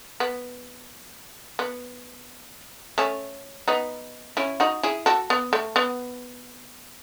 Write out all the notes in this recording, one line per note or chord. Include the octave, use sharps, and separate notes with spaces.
B3
B3
A3 C#4
B3 D#4
C#4 E4
D#4 F#4
E4 G#4
F#4 A4
B3
A3
B3